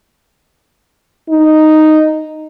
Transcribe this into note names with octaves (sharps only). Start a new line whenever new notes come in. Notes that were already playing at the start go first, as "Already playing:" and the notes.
D#4